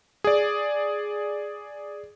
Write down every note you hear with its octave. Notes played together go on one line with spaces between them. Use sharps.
G#4 D5